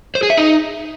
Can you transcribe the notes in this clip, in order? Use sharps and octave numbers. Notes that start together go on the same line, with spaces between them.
C5
G#4
E5
D#4